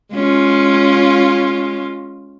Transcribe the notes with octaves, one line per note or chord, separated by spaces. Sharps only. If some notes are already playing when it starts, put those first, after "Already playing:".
G#3 C#4 F4